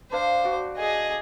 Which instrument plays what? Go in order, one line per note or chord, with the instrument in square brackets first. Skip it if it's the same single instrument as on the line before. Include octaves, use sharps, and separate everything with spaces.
[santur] D4 F5 [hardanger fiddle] C5
[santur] F#4 D5
[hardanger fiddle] G#4 D#5